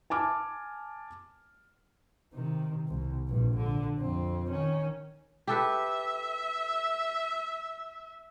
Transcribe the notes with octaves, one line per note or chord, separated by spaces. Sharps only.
G#5 A5 D6 F6
C3 D#3
C2
A#1 G2
D3
F2 C4
D#3 C#4
G4 A4 B4 E5